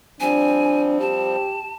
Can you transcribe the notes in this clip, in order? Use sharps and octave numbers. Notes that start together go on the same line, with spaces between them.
F3 G3 C4 D4 G#5
G4 A5